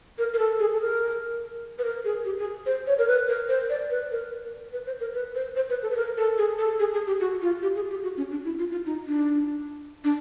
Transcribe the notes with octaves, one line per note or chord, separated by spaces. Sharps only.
A#4
A#4
A4
G#4
A4
A#4
B4
A#4
G#4
G4
G#4
C5
C#5
A#4
B4
A#4
C5
D5
B4
A#4
B4
C5
A#4
B4
C5
C5
B4
A4
B4
A#4
A4
G#4
A4
G#4
G#4
G4
F#4
F4
G4
G#4
G4
F#4
C#4
D4
E4
F4
F4
D#4
D4
D4